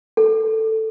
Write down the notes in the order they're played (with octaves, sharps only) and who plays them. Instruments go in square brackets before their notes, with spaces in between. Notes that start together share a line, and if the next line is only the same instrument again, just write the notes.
[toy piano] A4